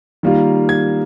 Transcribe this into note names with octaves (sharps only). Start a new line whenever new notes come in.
D#3 G3 A#3 F4
G#6